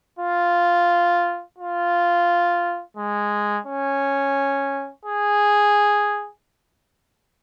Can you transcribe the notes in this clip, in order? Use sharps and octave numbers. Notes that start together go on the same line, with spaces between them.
F4
F4
G#3
C#4
G#4